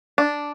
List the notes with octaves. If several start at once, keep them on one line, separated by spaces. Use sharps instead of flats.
D4